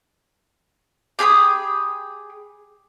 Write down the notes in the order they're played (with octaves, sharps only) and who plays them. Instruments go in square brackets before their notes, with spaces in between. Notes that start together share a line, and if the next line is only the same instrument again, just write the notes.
[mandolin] G4 G#4 B5 D#6